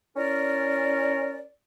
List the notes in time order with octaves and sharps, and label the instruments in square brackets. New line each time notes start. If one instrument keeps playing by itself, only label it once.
[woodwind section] C#4 E4 A#4 D5